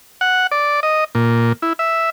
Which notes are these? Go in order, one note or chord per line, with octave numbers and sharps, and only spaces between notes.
F#5
D5
D#5
A#2
E4
E5